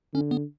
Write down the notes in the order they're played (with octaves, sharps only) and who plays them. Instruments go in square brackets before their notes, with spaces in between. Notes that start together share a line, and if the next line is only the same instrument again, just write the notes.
[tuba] D3 [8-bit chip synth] C#4
[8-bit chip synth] B3